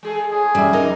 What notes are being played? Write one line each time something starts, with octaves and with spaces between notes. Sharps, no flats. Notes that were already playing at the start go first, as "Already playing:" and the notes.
G#3 G#4 A4
A2 G#4
F#2 E3 G3 A#3 E5
C#3 A3 A#3 D#4 A#4 D#5